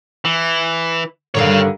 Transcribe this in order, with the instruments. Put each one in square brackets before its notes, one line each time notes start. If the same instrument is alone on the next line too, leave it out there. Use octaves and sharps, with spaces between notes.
[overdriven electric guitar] E3
[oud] G2 D3 D#3 [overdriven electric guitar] C#5 F5